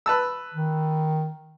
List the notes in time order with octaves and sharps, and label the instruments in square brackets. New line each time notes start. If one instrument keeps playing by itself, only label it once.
[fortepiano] B4 A5 E6
[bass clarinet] D#3